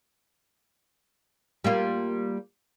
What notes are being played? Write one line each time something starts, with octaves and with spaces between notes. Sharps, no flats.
G3 A#3 F4